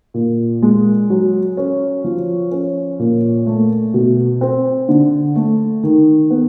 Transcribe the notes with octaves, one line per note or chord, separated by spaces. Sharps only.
A#2
G#3
F#3
C#4
F3
C#4
A#2
A3
B2
C4
D3
A3
D#3
B3